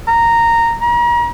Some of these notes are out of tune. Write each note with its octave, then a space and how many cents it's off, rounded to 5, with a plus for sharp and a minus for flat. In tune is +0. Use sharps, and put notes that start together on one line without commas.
A#5 -10
A#5 +40